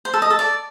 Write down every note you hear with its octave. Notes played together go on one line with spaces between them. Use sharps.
C5
A4
D#5
A4
D5